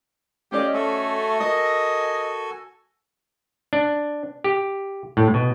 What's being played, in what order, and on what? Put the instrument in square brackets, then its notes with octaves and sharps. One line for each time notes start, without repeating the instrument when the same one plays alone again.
[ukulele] C#4 D5 D#5 [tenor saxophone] G4 [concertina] F5
[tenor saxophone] A3 [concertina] F#4 A4 G#5
[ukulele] A#4 [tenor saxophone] D#5
[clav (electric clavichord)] D4
G4
A2
B2